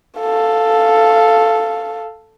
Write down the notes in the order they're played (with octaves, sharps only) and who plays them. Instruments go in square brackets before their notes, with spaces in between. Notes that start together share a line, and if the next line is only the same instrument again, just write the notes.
[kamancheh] A4 F5